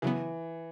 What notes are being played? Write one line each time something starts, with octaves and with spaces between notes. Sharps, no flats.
C#3 E3 F#3 B3